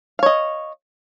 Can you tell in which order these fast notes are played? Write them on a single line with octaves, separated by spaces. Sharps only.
F5 C#5 D#5